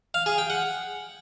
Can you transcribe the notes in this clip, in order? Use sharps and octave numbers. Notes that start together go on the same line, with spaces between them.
F5
G#4
G5
F#5